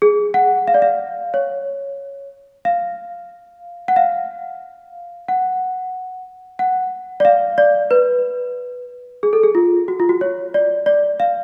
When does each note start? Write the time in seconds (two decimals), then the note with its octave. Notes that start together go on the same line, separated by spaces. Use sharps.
0.02 G#4
0.34 F#5
0.68 F5
0.74 D5
0.82 F5
1.34 C#5
2.65 F5
3.88 F#5
3.96 F5
5.28 F#5
6.59 F#5
7.20 D5
7.25 F5
7.58 D5
7.91 B4
9.23 G#4
9.33 A4
9.43 G#4
9.55 F4
9.88 F#4
10.00 F4
10.09 F#4
10.21 C#5
10.54 D5
10.86 D5
11.20 F5